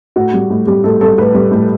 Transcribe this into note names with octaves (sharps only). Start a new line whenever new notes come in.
A2 F#4
G3
A2
G3 G4
A2 A4
G3 A4
A2 B4
G3
A2